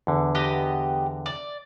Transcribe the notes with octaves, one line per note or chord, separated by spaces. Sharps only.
E2 D3
B3 G4 D#5
D5